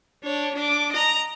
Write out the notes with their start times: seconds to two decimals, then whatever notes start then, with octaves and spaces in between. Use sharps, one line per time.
0.23 D4 C#5
0.55 D4 D6
0.92 D#5 A#5